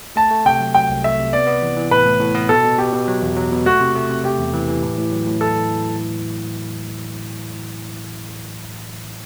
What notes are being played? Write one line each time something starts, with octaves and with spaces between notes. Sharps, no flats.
A3 A5
A3
C3 G5
F#3
F#3 G5
C2
A3 E5
C3
B3 D5
B3
E3
E3
A2 B4
A2
A2
B3
B2 A4
B2
B2 G4
B2
F#3
E2
F#3
B2
A3 F#4
C3
A3
C3
A3 G4
E2
E3
E3
A2
A2
F#3
A2
E4 A4